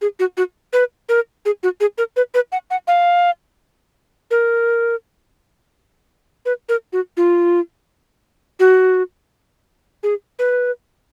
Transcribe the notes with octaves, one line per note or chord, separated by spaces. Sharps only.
G#4
F#4
F#4
B4
A#4
G#4
F#4
G#4
A#4
B4
B4
F#5
F#5
F5
A#4
B4
A#4
F#4
F4
F#4
G#4
B4